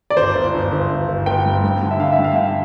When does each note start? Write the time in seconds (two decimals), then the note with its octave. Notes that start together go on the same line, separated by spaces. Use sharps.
0.10 D5
0.16 G1 C5
0.35 G1
0.54 G1
0.72 G1
0.90 G1
1.08 G1
1.26 G1 G5
1.46 G2
1.64 G2
1.83 D3
1.91 E5
2.00 D3 F5
2.13 E5
2.19 G2
2.24 F5
2.36 D3 G5